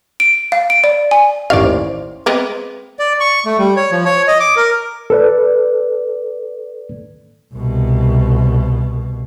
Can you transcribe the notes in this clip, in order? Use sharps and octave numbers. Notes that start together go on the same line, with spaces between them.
D7
F5
D7
D5
G#5
A1 D#2 D5 F5 C#6
C5
G#3 B3 C4
D5
C#6
A3
G3
C#5
F3
C#5
D#5
D6
A#4
A4 B4 D5
C2 B2